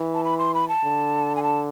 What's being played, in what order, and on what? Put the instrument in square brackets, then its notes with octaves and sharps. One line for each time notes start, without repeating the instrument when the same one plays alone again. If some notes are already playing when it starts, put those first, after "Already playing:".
Already playing: [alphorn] E3
[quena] A5
B5
C6
B5
A5
[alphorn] D3
[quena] G#5
A5